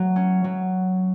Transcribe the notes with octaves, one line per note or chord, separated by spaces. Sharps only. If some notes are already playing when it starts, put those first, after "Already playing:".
Already playing: F#3 A3
C#4
F#3